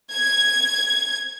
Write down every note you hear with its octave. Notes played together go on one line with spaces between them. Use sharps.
G#6